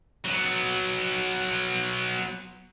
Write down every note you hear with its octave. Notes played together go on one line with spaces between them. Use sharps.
F#3 B3